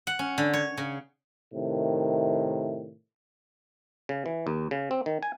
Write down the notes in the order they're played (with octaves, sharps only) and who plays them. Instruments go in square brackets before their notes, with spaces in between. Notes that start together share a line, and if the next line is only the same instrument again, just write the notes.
[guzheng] F#5
C#4
D3
C#5
C#3
[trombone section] A2 C3 D#3
[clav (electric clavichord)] C#3
E3
D#2
C#3
C4
D#3
G#5